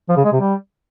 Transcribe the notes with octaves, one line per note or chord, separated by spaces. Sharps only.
F3
C#3
G#3
C3
G3